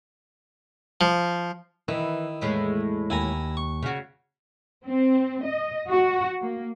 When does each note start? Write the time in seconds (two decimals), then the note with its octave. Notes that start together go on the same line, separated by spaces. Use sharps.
1.01 F3
1.88 D#3 E3 E4
2.41 E2 A2 G#3
3.10 D#2 E4 G#5 A#5
3.57 C#6
3.83 C#3 F#4
4.86 C4
5.45 D#5
5.89 F#4
6.41 A#3